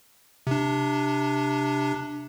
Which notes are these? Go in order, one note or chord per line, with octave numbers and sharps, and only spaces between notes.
C3 D4